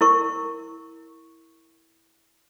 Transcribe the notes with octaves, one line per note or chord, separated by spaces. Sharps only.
E4 A#4 C#6